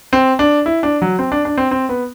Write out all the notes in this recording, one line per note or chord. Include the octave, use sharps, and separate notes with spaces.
C4
D4
E4
D4
F#3
C4
D4
D4
C4
C4
B3